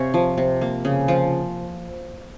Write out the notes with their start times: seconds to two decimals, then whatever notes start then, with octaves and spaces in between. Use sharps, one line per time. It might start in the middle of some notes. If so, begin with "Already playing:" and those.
Already playing: C3 C4 C#5 F5 G#5
0.14 F3
0.38 C3
0.61 A#3
0.85 C#3
1.08 F3 F4